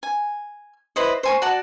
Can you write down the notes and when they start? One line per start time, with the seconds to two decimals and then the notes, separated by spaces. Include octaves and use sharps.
0.03 G#5
0.96 E4 B4 C5 D#5
1.23 C5 G#5 C#6
1.42 F#4 D5 F#5 A5